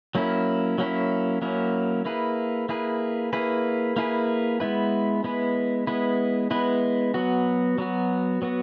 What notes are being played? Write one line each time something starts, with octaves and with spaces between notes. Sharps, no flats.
F#3 A#3 C#4 E4
F#3 A#3 C#4 E4
F#3 A#3 C#4 E4
A#3 E4 G#4 B4
A#3 E4 G#4 B4
A#3 E4 G#4 B4
A#3 E4 G#4 B4
G#3 B3 E4 B4
G#3 B3 E4 B4
G#3 B3 E4 B4
G#3 B3 E4 B4
F#3 B3 F#4
F#3 B3 F#4
F#3 B3 F#4